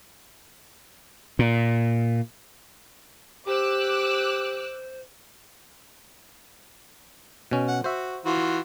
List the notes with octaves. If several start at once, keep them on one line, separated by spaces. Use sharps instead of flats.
A#2
G4 C5 D6 E6 F#6
B2 C#4
F#5
F#4 C5 E5
E3 F4 F#4